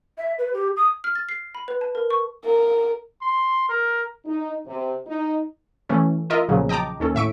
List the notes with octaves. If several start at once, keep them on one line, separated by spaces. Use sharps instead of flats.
E5
B4
G4
D#6
F6
A6
C7
B5
B4
A5
A#4
C#6
A#4
C6
A#4
D#4
C3
D#4
E3 A3 C#4
F4 A#4 D#5 E5
B1 A#2 C#3 F3 F#3
D#5 G5 A5 A#5 D6
D#2 C#4 A4
A2 E5 C#6 D7